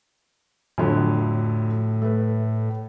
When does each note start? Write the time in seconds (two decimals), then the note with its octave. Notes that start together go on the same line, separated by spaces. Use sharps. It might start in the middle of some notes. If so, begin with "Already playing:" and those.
0.78 F2 A2 D3 F#3
2.02 A3 B4